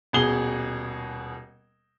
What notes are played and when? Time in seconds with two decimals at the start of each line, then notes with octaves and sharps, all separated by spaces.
0.13 D#1 B2 G#4 G7